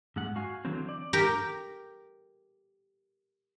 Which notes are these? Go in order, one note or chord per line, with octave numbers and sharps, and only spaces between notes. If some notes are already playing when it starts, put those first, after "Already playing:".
G#2 G#3 F#5
F#4 F5 G#5
D3 E3 F#3 C4
D5
G4 A#4